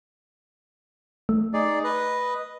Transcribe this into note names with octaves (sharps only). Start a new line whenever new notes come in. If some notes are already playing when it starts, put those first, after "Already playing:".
A3
D#4 G#4 D5
B4 D#5